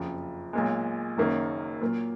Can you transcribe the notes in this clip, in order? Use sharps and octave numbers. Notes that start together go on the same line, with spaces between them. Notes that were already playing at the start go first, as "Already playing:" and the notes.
Already playing: F#1 F2 F3
B1 A#2 G#3
F#1 F#2 D#3 A#3
A#2 F#3 A#3